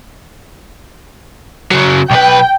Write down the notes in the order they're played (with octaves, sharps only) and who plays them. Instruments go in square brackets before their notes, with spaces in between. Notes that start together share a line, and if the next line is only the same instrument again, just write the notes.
[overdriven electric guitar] C#3 F#3
[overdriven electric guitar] B1 B4 [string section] G5